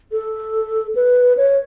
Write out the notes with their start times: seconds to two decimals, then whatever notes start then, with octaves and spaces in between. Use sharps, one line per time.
0.12 A4
0.96 B4
1.37 C#5